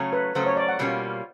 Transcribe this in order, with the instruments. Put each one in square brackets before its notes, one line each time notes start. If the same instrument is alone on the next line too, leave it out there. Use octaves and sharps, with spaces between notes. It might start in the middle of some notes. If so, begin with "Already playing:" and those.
Already playing: [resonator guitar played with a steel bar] C#3 F#3 A3 C#4
[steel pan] B4
[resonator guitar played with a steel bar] C#3 F#3 A3 C#4 [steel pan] C5
[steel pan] C#5
D5
F#5
[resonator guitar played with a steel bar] B2 G3 A#3 C#4 F4